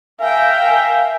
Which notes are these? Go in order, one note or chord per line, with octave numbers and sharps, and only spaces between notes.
A#4 E5 F5 G5 G#5